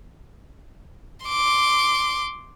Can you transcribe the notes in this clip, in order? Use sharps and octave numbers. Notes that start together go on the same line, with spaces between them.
C6 D6